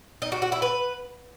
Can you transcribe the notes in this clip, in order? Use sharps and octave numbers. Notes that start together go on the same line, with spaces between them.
D#4
F#4
F#4
E4
B4